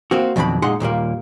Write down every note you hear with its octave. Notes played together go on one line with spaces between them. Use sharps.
A#3 C4 F#4
F2 B2 D#3 F#3 D4 B5
A#2 G#3 D#4 G#4 F#5 C6
D#2 A#2 G3 A#3